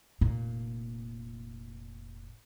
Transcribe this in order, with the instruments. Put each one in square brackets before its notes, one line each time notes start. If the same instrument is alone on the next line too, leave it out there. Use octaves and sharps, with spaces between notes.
[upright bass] F1 A#2